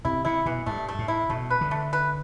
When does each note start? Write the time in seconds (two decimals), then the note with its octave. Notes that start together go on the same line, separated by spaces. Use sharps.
0.05 C3 E4
0.25 C3 E4
0.46 B2 E3
0.66 G2 A3
0.88 A3
0.99 A2
1.08 E4
1.30 B2 A3
1.50 B4
1.61 D3
1.71 A3
1.93 B4